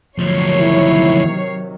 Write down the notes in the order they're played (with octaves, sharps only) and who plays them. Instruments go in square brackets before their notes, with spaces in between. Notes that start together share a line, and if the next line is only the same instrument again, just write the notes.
[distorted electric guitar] D2 F3 [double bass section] C3 D#3 F#3 [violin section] C#5 C7
[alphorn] E4